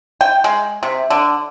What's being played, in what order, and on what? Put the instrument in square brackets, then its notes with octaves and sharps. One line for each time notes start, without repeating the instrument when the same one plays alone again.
[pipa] G5
G#3
C3
D3